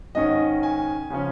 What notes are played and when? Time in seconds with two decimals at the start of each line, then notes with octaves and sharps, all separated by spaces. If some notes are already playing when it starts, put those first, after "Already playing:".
0.15 G#2 D#3 C#4 D#5
0.63 G#5
1.10 C#3 F3 C#4